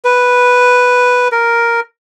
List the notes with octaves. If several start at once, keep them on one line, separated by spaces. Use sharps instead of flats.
B4
A#4